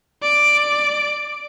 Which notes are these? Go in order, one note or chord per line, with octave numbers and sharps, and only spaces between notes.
D5 D7